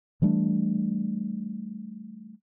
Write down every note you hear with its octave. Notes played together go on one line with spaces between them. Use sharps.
E3 G3 A3 D4